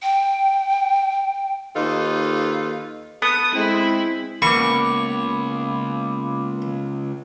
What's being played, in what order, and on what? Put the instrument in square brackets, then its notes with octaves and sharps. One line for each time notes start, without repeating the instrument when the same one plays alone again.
[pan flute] G5
[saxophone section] D#2 D#4 F4 A4 B4
[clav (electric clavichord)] B3 [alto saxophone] A4 [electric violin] D#6
[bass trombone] G#3 [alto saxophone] C4 [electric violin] E4 B5
[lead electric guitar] C#2 [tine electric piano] A#3 B3 [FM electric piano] B5 D6 [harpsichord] C#6